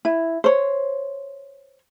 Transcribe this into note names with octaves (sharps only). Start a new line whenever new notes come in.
E4
C5 C#5